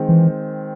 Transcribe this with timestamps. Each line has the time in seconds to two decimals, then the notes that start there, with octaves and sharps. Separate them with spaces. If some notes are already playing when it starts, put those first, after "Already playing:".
Already playing: D#3 G#3 C4
0.09 E3